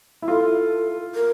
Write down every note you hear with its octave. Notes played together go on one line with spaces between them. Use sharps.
E4
F4 A4
A#4